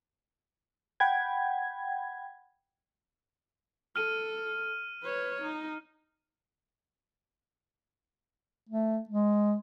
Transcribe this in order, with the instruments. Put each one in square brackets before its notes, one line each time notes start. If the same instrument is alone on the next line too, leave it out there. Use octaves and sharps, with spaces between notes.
[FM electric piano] F#5 G5 B5 G#6
[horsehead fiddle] A4 [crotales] F6 D#7
[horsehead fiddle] B4 C#5
D#4
[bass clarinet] A3
G#3